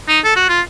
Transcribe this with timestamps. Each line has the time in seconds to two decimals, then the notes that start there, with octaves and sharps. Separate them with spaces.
0.08 D#4
0.24 A4
0.36 F#4
0.49 F4